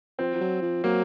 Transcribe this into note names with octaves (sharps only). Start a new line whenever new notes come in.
F3 C4
F3
F#3
F3
F#3 A#3